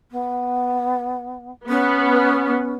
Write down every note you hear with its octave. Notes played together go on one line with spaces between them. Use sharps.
B3
B3 C#4